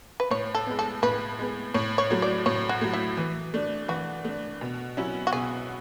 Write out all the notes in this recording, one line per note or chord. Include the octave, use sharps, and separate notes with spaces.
B4
A2 C#5
A4
G#3 B3
A4
A2 B4
G#3 B3
A2 C#5
C#5
F#3 A3
D5
A2 C#5
F#4
F#3 A3
E4
E3
A3 D4
E3 F#4
A3 D4
B2
F#3 C#4 E4
F#4
B2 G#4